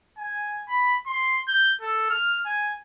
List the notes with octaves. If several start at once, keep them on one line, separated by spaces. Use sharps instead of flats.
G#5
B5
C6
G6
A4
F6
G#5